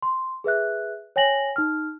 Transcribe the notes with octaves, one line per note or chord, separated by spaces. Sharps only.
C6
G#4 B4 E5 F#6
C#5 G5 G#5 A#6 F#7
D#4 F6